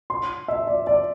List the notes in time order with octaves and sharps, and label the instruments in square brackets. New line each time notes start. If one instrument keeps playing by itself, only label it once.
[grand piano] C6
E5
D5
D5